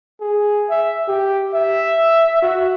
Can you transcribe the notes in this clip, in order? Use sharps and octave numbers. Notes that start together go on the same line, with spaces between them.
G#4
E5
G4
E5
F#4